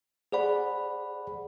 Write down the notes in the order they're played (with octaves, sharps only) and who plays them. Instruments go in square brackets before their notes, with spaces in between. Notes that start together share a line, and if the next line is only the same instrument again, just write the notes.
[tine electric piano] G#4 C5 D5 F#5 B5